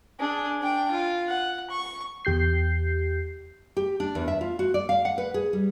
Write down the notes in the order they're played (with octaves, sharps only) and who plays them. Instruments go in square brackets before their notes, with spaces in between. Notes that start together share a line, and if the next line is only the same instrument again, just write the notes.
[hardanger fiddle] D4 G#4
D4 G5
F4
F#5
C#6
[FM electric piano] E2 G4 G6 C7
[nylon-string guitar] G4
D4
E2
E5
F4
F#4
D5
F5
F#5
B4
G#4
G3